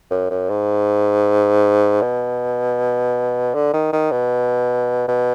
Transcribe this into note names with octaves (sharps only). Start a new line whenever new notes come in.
F#2
F#2
G#2
B2
D3
D#3
D#3
B2
B2